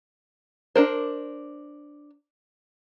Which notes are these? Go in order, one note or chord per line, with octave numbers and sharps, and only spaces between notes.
D4 A#4 C5